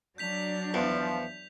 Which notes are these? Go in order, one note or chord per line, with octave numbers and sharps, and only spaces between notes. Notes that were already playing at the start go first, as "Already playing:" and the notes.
F#3 D4 G6 B6 F7
E2 F3